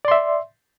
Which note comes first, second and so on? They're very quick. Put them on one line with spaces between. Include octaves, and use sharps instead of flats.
D5 C6 E5